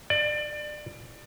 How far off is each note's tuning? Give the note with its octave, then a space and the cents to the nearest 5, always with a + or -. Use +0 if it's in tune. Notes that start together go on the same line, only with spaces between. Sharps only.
D5 +25